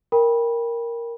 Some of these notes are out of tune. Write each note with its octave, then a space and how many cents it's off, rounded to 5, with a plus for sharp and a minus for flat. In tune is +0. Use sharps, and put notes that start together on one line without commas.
A#4 +0 G5 +20 B5 -20